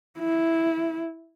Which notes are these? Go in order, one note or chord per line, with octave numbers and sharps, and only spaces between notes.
E4